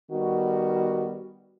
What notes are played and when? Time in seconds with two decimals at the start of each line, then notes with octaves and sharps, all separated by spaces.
0.12 D#3 G3 B3 F#4